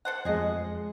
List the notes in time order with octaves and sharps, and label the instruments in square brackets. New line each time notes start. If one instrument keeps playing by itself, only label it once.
[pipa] A4 C5 F#5
[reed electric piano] F2 G#3 [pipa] G#4 D#5